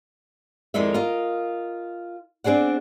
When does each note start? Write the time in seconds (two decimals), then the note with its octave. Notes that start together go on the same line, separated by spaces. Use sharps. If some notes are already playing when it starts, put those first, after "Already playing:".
0.74 F2 D#3 G#3 D#4 D5 E5
0.94 F4 A#4 D#5 F5
2.44 C4 D4 G#4 D5 F#5